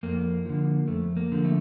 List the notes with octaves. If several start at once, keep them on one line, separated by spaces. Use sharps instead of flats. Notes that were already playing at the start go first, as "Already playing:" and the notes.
F2 A#3
D3 F3
F2 A3
A#3
D3 F3
A3